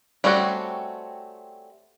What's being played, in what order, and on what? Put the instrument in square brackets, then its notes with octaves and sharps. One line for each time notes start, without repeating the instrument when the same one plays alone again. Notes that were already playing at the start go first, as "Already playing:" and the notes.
[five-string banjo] G3 A3 C4 C#4 F#4